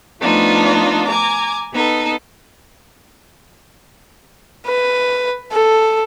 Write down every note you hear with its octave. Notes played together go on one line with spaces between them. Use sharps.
F3 A3 B3 D4 D#4 F4
G#5 A#5 D6
B3 D#4 A4
B4
A4